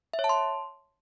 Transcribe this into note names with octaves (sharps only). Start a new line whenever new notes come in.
E5
C#5
A5
C6